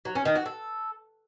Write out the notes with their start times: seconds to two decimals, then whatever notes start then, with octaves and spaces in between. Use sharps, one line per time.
0.05 F#3
0.15 C#4
0.25 D#3
0.35 F#4
0.46 A4